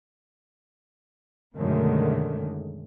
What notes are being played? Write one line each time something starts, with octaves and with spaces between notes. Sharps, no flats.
F#2 B2 D3 D#3 G#3 A3